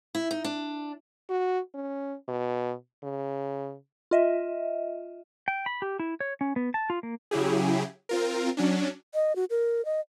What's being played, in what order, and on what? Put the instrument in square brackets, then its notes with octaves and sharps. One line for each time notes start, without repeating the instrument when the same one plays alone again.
[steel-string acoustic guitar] E4
D#4
D4
[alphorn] F#4
C#4
B2
C#3
[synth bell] F4 D#5 E5
[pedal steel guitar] G5
B5
G4
E4
C#5
C#4
B3
A5
F4
A#3
[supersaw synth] C#3 F#3 E4 G4 G#4
C4 F4 A#4
F#3 C#4 D4
[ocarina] D#5
F#4
A#4
D#5